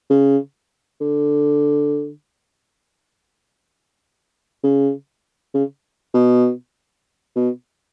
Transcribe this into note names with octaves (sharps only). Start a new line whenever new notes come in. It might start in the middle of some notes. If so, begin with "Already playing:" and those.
C#3
D3
C#3
C#3
B2
B2